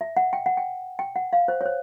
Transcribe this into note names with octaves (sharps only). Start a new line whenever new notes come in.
E5
F#5
G5
F#5
G5
G5
F#5
F5
C5
C#5
C5